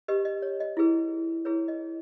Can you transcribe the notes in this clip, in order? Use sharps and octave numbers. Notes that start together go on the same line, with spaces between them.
G4 B4 D#5
D#5
C#5
D#5
E4 G#4 B4
E4 G#4 B4 C#5
D#5